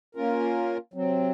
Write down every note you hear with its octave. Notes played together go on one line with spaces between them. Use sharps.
A#3 C#4 F4 A#4
C3 F#3 C4